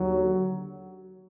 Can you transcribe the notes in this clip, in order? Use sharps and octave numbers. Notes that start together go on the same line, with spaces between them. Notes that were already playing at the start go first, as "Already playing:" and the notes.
Already playing: D#2 D3 F#3